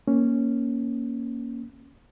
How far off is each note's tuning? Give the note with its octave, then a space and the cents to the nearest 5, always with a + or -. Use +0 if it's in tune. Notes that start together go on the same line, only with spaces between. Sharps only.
A#3 +10 C#4 +0